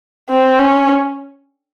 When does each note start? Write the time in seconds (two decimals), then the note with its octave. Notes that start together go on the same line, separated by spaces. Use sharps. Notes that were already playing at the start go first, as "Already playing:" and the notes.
0.30 C4
0.59 C#4